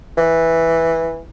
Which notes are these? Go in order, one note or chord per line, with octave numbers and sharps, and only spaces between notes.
E3